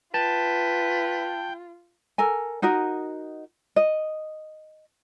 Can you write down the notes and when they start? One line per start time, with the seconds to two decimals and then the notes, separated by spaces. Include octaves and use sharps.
0.14 F4 B4 G5 A5
2.18 A4 A#4 G#5
2.62 D#4 F#4 A#4 D#5
3.76 D#5